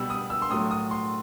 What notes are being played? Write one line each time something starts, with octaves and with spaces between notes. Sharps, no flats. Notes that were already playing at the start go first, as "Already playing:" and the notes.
Already playing: B2 G3 B3 E6
D#6
E6
C6
A2 F#3 A3 D#6
D#6
C6